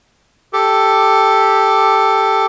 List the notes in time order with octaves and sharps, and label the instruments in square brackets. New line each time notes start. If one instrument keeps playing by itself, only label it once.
[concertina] G4 A4